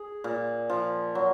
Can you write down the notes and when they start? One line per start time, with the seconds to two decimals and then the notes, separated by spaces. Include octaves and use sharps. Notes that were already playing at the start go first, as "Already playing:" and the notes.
Already playing: G#4
0.24 A#2
0.69 F3
1.15 F#3